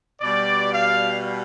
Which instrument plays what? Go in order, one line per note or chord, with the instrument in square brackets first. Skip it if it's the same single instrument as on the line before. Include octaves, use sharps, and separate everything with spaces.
[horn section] B2 G3 D5
F5